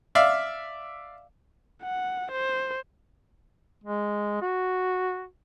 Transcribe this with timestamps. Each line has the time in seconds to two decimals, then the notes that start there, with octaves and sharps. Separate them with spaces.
0.15 D5 E5 F5
1.83 F#5
2.32 C5
3.84 G#3
4.42 F#4